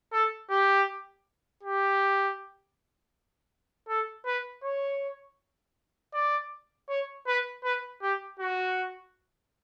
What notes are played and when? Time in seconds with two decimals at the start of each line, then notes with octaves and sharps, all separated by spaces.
0.13 A4
0.50 G4
1.63 G4
3.89 A4
4.26 B4
4.64 C#5
6.14 D5
6.89 C#5
7.27 B4
7.64 B4
8.02 G4
8.39 F#4